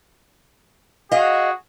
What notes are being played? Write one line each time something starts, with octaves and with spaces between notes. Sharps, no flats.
F#4 G#4 D#5 F5